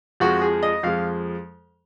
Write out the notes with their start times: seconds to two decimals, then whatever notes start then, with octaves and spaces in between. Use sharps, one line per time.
0.20 F2 F3 G#3 F#4
0.42 G#4
0.63 D#5
0.83 F2 F3 G#3 F5